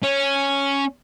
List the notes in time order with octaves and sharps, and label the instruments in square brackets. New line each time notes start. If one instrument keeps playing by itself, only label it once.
[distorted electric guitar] C#4